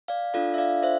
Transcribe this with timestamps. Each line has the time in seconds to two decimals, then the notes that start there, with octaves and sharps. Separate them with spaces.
0.08 D5 F5
0.34 D4 F4 A4 D5 F5
0.54 E5
0.58 D5 F5
0.83 C5 E5